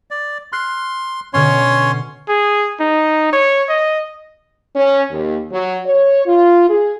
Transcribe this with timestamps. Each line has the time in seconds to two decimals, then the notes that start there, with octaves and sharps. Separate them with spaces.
0.11 D5
0.52 C6 F6 F#6 C7
1.34 B2 D3 B3 C#4 C#5 C6
2.28 G#4
2.80 D#4
3.33 C#5
3.69 D#5
4.76 C#4
5.10 D#2
5.52 F#3
5.86 C#5
6.26 F4
6.69 G#4